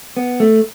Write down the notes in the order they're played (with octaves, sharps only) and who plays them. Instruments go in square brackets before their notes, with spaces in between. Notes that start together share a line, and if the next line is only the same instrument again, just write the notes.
[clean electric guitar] B3
A3